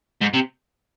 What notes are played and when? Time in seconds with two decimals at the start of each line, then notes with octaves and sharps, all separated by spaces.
0.21 G#2
0.34 C3